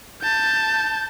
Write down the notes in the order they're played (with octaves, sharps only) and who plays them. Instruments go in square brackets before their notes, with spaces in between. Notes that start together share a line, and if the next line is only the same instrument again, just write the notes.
[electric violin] A5 G6